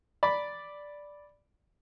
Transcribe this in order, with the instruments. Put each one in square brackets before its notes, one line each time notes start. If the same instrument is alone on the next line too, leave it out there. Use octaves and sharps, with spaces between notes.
[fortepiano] D5 B5